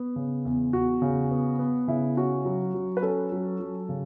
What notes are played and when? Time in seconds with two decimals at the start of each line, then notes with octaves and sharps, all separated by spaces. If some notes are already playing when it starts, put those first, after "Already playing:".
Already playing: B3
0.16 C#3
0.45 E2
0.73 E2 F#4
1.02 C#3
1.31 B3
1.59 B3
1.88 C#3 E4
2.17 C#4 F#4
2.45 F#3
2.74 F#3
2.97 B4
3.02 C#4 A4
3.32 F#3
3.60 F#3
3.89 C#3